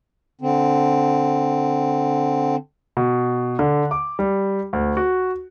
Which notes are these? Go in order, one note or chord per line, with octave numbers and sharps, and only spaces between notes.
D3 C4
B2
D3
D6
G3
D2
F#4